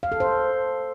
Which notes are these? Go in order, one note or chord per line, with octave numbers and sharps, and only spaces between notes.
F5
A4
C5